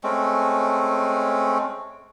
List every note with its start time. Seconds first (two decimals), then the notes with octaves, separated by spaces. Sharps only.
0.04 G#3 A3 C4 C#4